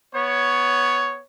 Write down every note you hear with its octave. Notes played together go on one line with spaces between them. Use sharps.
B3 C#5